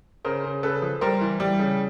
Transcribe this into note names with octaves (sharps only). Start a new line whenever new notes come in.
C#3 A#4 C5
C#3
C#3 A4 B4
F3
G3 A#4 C5
E3
G3
C#3